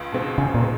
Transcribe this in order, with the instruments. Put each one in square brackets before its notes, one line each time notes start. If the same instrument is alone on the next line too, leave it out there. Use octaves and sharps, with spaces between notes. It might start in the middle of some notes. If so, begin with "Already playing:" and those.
Already playing: [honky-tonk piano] C#2
B2 G#3 C4
[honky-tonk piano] C#2 [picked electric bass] C#3
[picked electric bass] A#2
[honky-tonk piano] G#3 C4